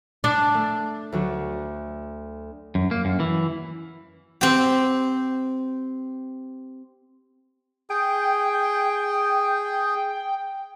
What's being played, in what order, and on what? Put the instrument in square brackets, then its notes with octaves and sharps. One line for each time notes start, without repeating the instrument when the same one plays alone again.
[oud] D4 [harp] D6 F#6 C7
[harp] A3
D2 F#3 F#4
[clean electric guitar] F#2
A#3
F#2
E3
[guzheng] C4 G4
[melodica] G#4 [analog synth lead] G5